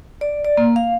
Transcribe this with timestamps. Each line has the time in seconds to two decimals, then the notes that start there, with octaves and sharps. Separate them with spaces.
0.21 D5
0.45 D5
0.57 A#3
0.76 F5